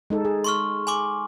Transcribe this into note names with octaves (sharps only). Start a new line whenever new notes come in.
G#3 D#4 A4
G#4
C6 C#6 F6
G#5 C6 D6